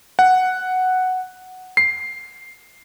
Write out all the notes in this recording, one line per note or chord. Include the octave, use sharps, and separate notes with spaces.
F#5
C7